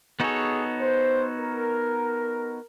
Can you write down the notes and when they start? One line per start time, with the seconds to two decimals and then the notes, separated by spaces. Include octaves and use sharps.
0.20 B3 D#4 F#4 G#4 A4 C#5
0.80 C5
1.40 A#4